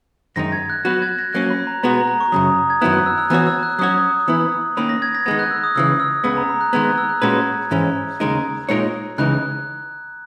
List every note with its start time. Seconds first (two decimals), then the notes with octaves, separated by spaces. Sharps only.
0.36 F#2 D#3 G#3 D#4 A#6
0.52 G#6
0.70 F#6
0.85 F#3 B3 F#4 B4 F#6
1.02 G#6
1.18 A#6
1.34 F#3 A#3 C#4 F#6
1.50 B5
1.67 A#5
1.83 B2 G#3 B3 F#4 A#5
1.95 A#5
2.08 A#5
2.20 C#6
2.32 F#2 C#3 F#3 D#6
2.70 G#6
2.81 F#2 D#3 F#3 B3 E4 F#6
2.93 F#6
3.06 E6
3.18 E6
3.30 E3 B3 F#4 C#5 F#6
3.47 E6
3.63 F#6
3.79 F#3 C#4 F#4 C#5 D#6
4.28 E3 B3 E4
4.77 D#3 A#3 C#4 B5
4.89 A#6
5.02 G#6
5.15 A#6
5.26 D#3 G#3 B3 G#6
5.39 F#6
5.51 E6
5.64 D#6
5.75 C#2 C#3 E3 E6
6.00 E6
6.24 C#2 C#3 G#3 B3 E6
6.37 A#5
6.49 B5
6.61 F#6
6.73 D#3 G#3 B3 G#6
6.85 F#6
6.98 E6
7.09 F#6
7.22 A#2 G#3 C#4 F#4 B4 G#6
7.71 G#2 E3 G#3 C#4
8.20 D#2 C#3 G#3 D#4 A#4
8.69 A#2 G#3 D#4 A#4 C#5
9.18 C#2 C#3 E3 G#3 D#4 F#6